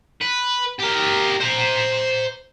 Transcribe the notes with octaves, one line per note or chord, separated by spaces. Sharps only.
B4
G4 A#4
C5 A#5